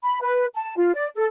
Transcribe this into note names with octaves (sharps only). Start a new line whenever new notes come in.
B5
B4
A5
F4
D5
A4